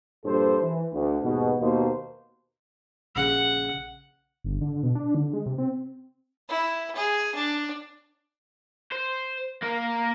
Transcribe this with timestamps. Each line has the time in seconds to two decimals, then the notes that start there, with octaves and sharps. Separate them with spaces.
0.25 A#1 G2 A4 C5
0.62 E3
0.94 D2
1.23 D#2 G#2 B2
1.59 D#2 B2 A#3 D#4 C5
3.16 A#1 C#3 F#5
4.44 G1
4.61 D3
4.83 B2
4.95 D4
5.15 D3
5.33 G#3
5.46 C3
5.58 C4
6.49 E4
6.95 G#4
7.35 D4
8.92 C5
9.62 A#3 A#4